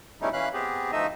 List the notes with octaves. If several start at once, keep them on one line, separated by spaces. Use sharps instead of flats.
B2 G3 A3 C#4 D#4 E4
E3 C#4 F5 B5 F#6
B3 C4 G4 G#4
D2 F3 A3 D#4 D#5 E5